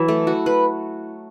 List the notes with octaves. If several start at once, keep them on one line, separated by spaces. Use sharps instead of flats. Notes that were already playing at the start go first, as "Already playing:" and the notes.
Already playing: E3 F#3 E4
A3
F#4
B4